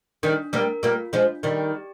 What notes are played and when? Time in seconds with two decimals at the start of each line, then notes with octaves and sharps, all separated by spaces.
0.23 D#3 G3 D4
0.53 G3 A#3 A#4
0.83 G3 A#3 F4
1.13 F3 G#3 D4
1.43 D#3 G3 D5
1.74 G4